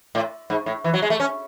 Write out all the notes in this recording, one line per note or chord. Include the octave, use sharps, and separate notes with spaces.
A2
G#2
A2
E3
F#3
G#3
A3
C#4